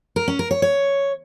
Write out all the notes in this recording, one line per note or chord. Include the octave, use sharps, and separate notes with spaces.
A#4
C#4
A#4
C#5
C#5